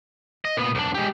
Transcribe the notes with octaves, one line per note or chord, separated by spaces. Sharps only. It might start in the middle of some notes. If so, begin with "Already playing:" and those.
D#5
A#2 B3
B1 D4
G#3 G4